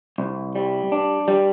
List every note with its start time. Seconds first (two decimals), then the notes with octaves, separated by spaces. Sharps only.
0.18 C2
0.55 G3
0.92 D4
1.28 G3